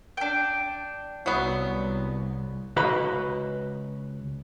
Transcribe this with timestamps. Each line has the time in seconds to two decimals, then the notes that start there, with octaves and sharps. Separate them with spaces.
0.17 D4 G5
1.26 C2 F#3 B3
2.76 C#2 F#4 B4 D#5 A#5 B5